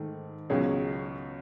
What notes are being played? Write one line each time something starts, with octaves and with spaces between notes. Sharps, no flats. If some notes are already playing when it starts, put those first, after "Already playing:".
Already playing: G#2 D#3 A3
C#2 B2 F#3 C#4 G#4